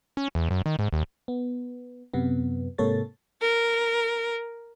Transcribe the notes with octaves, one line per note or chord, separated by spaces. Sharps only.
C#4
E2
F#2
D#3
G#2
D#2
B3
F#2 C3 B3
G#2 C3 A#3 A4 C#5 A6
A#4